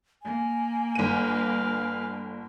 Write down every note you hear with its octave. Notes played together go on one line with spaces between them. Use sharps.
A#3 G#5
G1 B4 F5 D#7